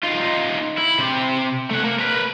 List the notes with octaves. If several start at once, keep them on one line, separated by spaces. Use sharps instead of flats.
D#4 F4
E4
C3 C5
A3 F#5
A#3
A#4 B4